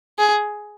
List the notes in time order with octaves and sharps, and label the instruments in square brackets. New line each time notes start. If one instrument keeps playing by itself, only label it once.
[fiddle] G#4